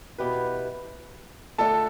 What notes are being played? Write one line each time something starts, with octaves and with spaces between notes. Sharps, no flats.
B2 B3 E4 G4 B4
D3 A3 D4 F4 A4 A5